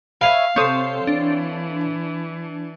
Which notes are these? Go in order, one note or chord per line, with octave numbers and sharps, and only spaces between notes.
B4 C#5 E5 F5
C3 C4 A4 C#5 C6 D#6
E3 D4